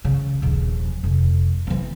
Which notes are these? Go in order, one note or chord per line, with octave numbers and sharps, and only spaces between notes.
C#3
D#1 A#1
F1
E3 C4